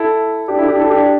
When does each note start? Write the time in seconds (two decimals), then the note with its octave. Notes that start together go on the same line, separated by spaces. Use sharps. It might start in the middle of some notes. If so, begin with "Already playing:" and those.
Already playing: E4 A4
0.48 D4 G4
0.58 E4 A4
0.68 D4 G4
0.79 E4 A4
0.90 D4 G4